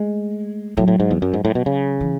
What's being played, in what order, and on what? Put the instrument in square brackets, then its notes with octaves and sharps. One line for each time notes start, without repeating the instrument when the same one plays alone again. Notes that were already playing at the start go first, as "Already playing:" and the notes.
Already playing: [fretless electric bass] G#3 [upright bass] A3
[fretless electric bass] A2 [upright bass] F#3
[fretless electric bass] A2
G#2
E2
F#2
G#2
A2
B2
C#3
[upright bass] E3